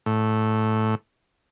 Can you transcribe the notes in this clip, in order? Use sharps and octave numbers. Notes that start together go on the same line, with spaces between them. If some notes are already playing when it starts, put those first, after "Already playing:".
A2